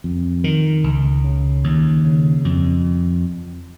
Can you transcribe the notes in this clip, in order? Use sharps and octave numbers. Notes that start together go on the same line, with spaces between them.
F2
D#3
C#2
C#3
D#2
C#3
F2